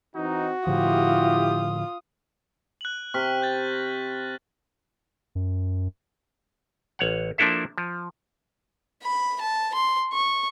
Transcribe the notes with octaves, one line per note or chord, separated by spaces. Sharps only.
E3 C4 D#4 F#4
A2 D3 F3 E4 F4 G4 D#6
F#6 F#7
C3 C#6 F6 B6
F6 G6 A6
A#6
F#2
A1 C#5 F#5
F3 A#3 D4 E4 A4 E5
F3
B5
A5
C6
C#6